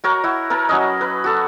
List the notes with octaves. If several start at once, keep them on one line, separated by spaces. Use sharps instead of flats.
F#4 A#4 C#5 A#5
E4 F#4
A#4 B4 A5
F#3 C#4 D#5
B4
F#4 A4